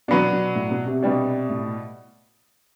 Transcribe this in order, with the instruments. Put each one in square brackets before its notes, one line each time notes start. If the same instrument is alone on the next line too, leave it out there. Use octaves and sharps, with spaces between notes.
[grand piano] B2 [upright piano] F#3 B3 D4
[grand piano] B2
A2
B2
C3
[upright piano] B2 G3 D4
[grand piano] A2